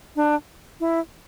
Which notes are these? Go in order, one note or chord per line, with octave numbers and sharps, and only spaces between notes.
D4
E4